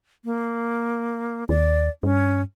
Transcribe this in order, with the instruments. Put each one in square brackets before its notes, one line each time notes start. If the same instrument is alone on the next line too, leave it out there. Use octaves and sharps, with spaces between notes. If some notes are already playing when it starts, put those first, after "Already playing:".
[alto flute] A#3
[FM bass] D#2 [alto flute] D5
[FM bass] G2 [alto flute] C#4